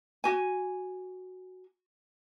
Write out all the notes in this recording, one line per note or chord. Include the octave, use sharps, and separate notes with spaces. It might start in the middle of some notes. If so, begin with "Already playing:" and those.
F#4 G#5